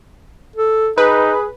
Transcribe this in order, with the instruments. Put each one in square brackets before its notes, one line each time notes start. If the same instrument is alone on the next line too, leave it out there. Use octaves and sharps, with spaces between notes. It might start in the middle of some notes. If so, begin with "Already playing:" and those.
[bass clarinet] A4
[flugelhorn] D#4 [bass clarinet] G#4 [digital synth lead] B4